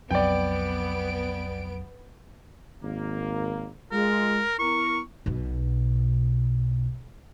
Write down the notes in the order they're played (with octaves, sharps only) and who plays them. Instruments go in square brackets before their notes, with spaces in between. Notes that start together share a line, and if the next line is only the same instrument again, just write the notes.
[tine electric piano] B1 F2 F#3 [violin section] B3 D7 [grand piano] D5 G5
[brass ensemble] G#1 A#3
[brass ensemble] G#3 F4 [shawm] A#4
[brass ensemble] B3 E4 A#4 [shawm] C#6
[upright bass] B1 B2